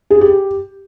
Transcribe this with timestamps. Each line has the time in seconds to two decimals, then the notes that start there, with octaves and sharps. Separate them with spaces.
0.10 G#4
0.21 G4